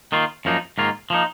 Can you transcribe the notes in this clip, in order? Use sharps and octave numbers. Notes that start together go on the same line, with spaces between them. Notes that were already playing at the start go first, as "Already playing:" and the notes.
D#3 A#3 F4
F#2 F3 A#3 D#4
G#2 D#3 A#3 F4
F3 A#3 D#4